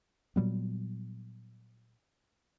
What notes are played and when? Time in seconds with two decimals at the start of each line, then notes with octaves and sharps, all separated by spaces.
0.36 A#2 F#3 G3 B3